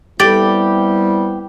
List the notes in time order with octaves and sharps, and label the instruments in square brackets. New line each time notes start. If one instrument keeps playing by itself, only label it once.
[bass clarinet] G3 [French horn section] B3 C4 E4 [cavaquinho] G4 [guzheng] D5